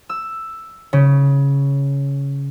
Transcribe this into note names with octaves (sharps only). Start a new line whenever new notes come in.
E6
C#3